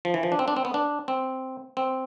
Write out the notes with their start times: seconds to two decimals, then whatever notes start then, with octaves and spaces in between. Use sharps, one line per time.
0.05 F3
0.14 E3
0.23 F3
0.32 D4
0.39 C4
0.48 D4
0.57 C4
0.65 B3
0.74 D4
1.08 C4
1.77 C4